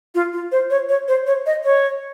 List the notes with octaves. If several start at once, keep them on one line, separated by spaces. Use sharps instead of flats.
F4
F4
C5
C#5
C#5
C5
C#5
D#5
C#5